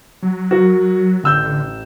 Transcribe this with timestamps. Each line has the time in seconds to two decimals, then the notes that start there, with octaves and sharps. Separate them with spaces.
0.23 F#3
0.51 F#4 A#4
1.23 A1 D3 E6 G6